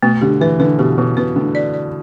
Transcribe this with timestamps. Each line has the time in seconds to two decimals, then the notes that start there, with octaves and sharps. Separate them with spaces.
0.03 B2 A3
0.21 D3 G4
0.41 E3 B4
0.60 D3 B4
0.79 B2 G4
0.98 B2 D3
1.17 B2 B4
1.36 D3 A3
1.55 D5
1.74 D5